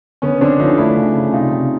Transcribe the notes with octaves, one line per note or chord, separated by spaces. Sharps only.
D3 B3 C#4
D3 C4 D4
F3 C#4 D#4
A3 D4 E4
C#3
C#3
C3 D#4 F4
C3